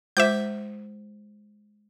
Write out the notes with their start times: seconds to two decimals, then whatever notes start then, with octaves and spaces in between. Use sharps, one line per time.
0.17 G#3 F4 C5 E5 D6 G6